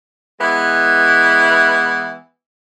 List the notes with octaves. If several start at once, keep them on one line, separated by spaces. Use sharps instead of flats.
E3 G#3 B3 E4